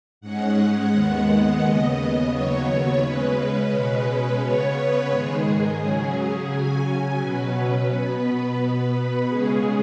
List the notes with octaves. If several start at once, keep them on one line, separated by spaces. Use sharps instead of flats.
G#2 G#3 C#4 F#5
D#2 D#3 G#3 B3 F#5
D#2 C#3 B3 D#5
D#2 C#3 F#3 B3 C#5
C#3 G#3 C#4 B4
B2 G#3 C#4
C#3 B3 C#5
B4
G#2 D#3 G#3 G#4
C#3 F#3 C#4 G#4
C#3 F#3 C#4 G#5
B2 F#3 C#4 B4
B2 B3
B2 B3
C#3 G#3 C#4 G#4